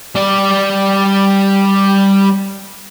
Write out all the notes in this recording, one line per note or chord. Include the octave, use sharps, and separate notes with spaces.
G3 D5